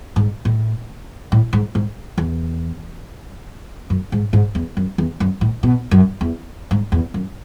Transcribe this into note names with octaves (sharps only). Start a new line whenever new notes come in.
G#2
A2
A2
G#2
G#2
E2
F#2
G#2
G#2
E2
F#2
E2
F#2
A2
B2
F#2
E2
G#2
E2
F#2